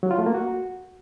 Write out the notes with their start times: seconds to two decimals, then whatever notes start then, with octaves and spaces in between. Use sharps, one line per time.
0.03 F#3
0.11 F4
0.19 A3
0.26 A#3
0.34 F#4